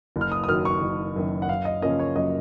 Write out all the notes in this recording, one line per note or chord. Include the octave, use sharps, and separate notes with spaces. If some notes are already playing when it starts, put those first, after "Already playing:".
F#1
F6
D#6
D#6
F#2 D#3 F#3 F6
C#6
F#1
F#2 D#3 F#3
F#5
F#2 F5
D#5
C#3 F3 A#3 C#4 D#5
C#5
F#2 D#5